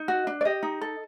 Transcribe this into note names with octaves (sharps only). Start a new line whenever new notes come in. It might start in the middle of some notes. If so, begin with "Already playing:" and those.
Already playing: D#4
F#4
D4
D5
G4 D#5
D#4
A4